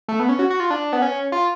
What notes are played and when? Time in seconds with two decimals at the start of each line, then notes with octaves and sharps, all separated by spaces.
0.08 A3
0.20 B3
0.29 C#4
0.39 F#4
0.50 F#4
0.60 F4
0.70 D4
0.93 B3
1.02 C#4
1.32 F4